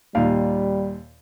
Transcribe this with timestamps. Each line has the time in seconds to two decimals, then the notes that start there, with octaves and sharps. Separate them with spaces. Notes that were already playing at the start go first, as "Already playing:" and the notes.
0.15 D#2 A#2 G3 F5